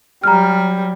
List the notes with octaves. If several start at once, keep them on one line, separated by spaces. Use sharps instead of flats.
F#3 G3 A#5 F6